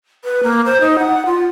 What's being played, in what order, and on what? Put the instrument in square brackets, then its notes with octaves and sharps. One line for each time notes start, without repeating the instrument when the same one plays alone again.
[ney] B4
A#3
C5
D#4
F#5
F4